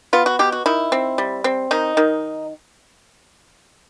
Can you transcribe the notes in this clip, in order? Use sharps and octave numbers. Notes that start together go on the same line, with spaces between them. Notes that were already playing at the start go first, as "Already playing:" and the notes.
B3 F4
F#4
B2 G4
F#4
D#3 E4
C4
G3
C4
D#3 D#4
D#3